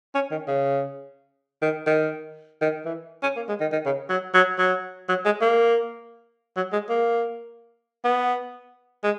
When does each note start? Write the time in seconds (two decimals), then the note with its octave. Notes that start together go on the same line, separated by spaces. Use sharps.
0.14 C#4
0.31 D#3
0.48 C#3
1.62 D#3
1.87 D#3
2.61 D#3
2.85 E3
3.23 C#4
3.36 A#3
3.48 G#3
3.60 D#3
3.72 D#3
3.85 C#3
4.09 F#3
4.34 F#3
4.58 F#3
5.08 F#3
5.25 G#3
5.41 A#3
6.56 F#3
6.73 G#3
6.89 A#3
8.04 B3
9.03 G#3